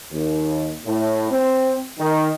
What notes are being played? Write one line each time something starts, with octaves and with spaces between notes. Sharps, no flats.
D#2
A2
C4
D#3